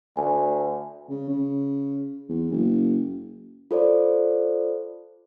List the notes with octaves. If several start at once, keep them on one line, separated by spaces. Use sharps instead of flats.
D2 G#5
C#3
C#3
E2
F#1
F4 A4 C5 D5